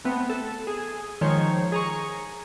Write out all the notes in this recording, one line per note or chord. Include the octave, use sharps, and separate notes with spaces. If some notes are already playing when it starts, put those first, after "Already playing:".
A3 B3 C4
A4
G#4
D#3 F3 G#3 C5 C#5
G#4 A#5 C#6